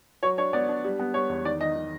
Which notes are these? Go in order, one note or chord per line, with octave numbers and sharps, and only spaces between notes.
F#3 C#5
D4 C#5
B3 D5
D4
G3
B3
G3 C#5
E2
D#3 D5
D#3 D#5
D#3